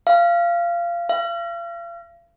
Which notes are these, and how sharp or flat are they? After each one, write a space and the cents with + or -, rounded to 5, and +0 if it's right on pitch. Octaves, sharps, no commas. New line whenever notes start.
F5 -20
F5 -40